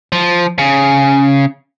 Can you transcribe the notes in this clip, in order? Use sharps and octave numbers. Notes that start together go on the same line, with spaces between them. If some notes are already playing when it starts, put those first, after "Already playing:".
F3
C#3